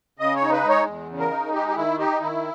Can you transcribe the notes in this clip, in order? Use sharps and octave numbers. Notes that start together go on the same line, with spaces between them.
C#3 D#5
C#5
D#4
B4
G#3
C#5
E2
C#3
A#4
D#4
G#3 G4
G4
D#3 E4
D#4 G4
D#3 E4